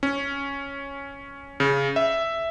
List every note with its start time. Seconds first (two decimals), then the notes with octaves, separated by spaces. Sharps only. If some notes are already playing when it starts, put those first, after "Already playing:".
0.03 C#4
1.60 C#3
1.96 E5